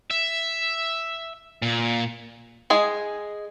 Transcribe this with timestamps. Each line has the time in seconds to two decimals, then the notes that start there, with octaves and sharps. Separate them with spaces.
0.10 E5
1.62 A#2
2.70 G#3 G#4